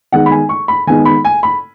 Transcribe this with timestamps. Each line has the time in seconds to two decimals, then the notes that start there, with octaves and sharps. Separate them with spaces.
0.12 D#3 G#3 B3 D#4 F#5
0.26 B5
0.31 G#5
0.49 C#6
0.68 B5
0.87 D#3 G#3 B3 D#4 G#5
1.05 B5
1.25 G#5
1.43 B5